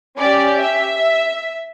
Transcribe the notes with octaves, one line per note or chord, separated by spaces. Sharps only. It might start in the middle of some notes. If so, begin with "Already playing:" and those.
C#4 G4 D5
E5